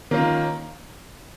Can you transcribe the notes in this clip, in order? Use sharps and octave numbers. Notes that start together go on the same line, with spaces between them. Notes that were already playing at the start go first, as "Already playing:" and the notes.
D#3 A#3 C#4 F4